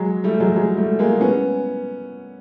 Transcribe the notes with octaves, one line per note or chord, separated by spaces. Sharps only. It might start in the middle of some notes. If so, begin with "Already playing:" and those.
Already playing: F#3 G#3
G3 A3
F#3 G#3
F#3 G#3
G3 A3
G#3 A#3
B3 C#4